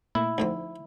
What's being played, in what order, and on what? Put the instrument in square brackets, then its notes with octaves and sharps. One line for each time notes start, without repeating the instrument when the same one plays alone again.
[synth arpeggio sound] A#2 A3 A#3 [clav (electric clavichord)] E4
[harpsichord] D2 D3 C4 [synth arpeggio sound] F3 D#4